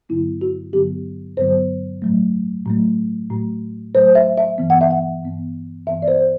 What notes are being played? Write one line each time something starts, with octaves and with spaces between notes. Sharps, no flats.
G2 D3 F#3 B3 E4
F#4
G2 D3 F#3 B3 G4
G2 D3 F#3 B3 C5
A2 F#3 A3
A2 F#3 A3
A2 F#3 A3
A2 F#3 A3 C5
E5
E5
G2 E3 B3
F#5
E5
F#5
G2 E3 B3
G2 E3 B3 E5
D5
C5